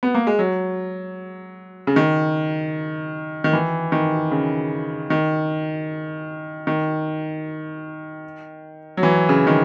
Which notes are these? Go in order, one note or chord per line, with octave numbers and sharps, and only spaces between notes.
B3
A#3
G#3
F#3
C#3
D#3
D#3
E3
D#3
C#3
D#3
D#3
F#3
E3
C#3
D#3